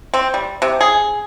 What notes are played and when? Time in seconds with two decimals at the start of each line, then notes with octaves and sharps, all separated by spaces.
0.14 C4
0.34 G3
0.62 C3
0.81 G#4